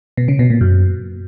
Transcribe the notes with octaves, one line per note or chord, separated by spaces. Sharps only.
B2
C#3
B2
A#2
F#2